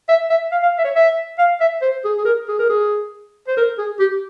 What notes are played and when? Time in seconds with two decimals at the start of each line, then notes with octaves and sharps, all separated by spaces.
0.09 E5
0.30 E5
0.52 F5
0.63 F5
0.78 E5
0.84 C#5
0.95 E5
1.38 F5
1.60 E5
1.82 C5
2.05 G#4
2.18 G#4
2.25 A#4
2.48 G#4
2.59 A#4
2.69 G#4
3.48 C5
3.57 A#4
3.78 G#4
4.00 G4